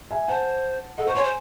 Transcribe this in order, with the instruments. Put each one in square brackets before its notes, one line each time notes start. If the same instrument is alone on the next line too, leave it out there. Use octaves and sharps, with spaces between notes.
[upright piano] E5 G#5
[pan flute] C5 [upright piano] F#5 A5
[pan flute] A4 [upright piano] D#5 F#5
[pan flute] C5 [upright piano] C#6
[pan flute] C#5 [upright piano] G#5 C6
[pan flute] C5